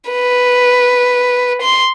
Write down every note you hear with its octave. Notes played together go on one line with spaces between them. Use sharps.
B4
C6